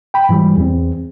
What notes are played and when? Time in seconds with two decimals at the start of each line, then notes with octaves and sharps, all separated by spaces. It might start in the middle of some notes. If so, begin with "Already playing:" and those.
0.14 G5 B5
0.29 G#2 E3 F#3 G3
0.57 E2 C4